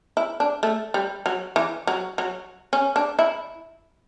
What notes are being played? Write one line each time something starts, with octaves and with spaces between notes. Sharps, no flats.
E4
D4
A3
G3
F#3
E3
F#3
F#3
C#4
D4
E4